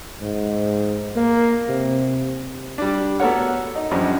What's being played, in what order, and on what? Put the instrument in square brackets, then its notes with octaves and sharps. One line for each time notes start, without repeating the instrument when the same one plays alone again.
[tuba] G#2
A#3
C3
[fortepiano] G3 D4
B3 F#4 A4 A#4 C#5 F#5
D#4
F#2 F3 G3 C#4 D4